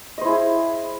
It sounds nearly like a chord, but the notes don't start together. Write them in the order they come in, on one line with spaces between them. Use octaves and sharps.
D#5 C5 E4 G#4